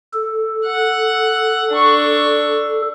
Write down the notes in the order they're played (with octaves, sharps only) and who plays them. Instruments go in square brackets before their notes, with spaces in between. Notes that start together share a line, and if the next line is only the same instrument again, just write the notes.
[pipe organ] A4
[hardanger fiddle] F#5
D4 C#6